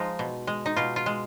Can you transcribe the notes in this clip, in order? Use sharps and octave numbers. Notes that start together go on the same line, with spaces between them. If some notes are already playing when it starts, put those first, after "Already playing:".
Already playing: F3 G#3 D#4 F4
B2
G#3
D#4
B2 F4
F4
G#3